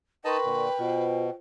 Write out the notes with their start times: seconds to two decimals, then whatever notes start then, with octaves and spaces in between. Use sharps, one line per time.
0.25 D#4 A#4 B4 D#5 G5 A5 C6 C#6
0.44 A#2 D3
0.79 B2 F4 C5